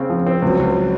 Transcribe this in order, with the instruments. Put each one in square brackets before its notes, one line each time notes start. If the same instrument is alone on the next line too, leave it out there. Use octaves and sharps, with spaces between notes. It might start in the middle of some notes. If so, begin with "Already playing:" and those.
Already playing: [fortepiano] C#3 C4
F3
C4
[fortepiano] C#2 [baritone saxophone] F#3
[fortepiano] C#2